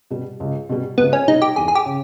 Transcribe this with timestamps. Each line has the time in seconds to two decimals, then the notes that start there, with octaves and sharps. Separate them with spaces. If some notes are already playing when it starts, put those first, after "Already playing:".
0.10 B2 G3
0.40 C#2
0.69 B2 G3
0.98 C#2 B3
1.13 C#4
1.27 B2 G3 D#4
1.42 G4
1.56 E2 G#4
1.68 G#4
1.75 G4
1.86 C#3